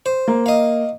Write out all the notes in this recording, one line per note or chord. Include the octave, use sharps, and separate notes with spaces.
C5
A#3
D#5 F5